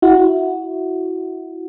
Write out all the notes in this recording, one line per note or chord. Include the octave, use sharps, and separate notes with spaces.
E4 F#4